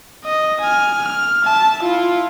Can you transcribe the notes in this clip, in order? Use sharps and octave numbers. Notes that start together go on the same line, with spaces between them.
D#5
G#5 F6
F6
E5 A5
E4 F4